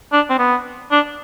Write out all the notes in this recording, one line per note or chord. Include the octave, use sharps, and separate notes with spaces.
D4
C4
B3
D4